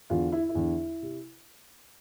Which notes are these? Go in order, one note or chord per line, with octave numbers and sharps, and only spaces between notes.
E2 D3 F4
E4
E4
E2 D3
C3